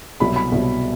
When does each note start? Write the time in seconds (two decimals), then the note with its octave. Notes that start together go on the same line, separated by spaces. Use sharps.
0.20 C2 B2 F#3 B5
0.36 B5
0.52 C2 B2 F#3